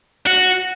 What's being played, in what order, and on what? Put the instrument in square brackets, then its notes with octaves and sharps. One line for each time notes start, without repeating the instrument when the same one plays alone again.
[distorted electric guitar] F#4